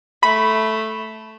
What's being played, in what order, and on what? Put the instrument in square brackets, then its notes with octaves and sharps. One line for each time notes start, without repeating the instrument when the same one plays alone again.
[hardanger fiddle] A3 [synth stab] B5